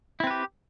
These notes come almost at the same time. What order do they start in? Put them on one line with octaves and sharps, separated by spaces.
E4 C4 B4 G4